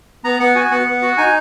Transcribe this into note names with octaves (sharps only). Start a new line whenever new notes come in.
B3 A#5
B3 F#5
F#4 G#5
B3 F#5
B3
F#4
D#4 G#5